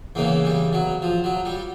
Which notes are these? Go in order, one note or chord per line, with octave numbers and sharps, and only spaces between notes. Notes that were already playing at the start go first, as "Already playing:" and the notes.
E2 C#3 E3 A#3
G3
F#3
F3
F#3
G3